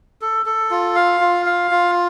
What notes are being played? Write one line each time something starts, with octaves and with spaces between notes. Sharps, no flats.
A4
A4
F4
F5
F4
F5
F4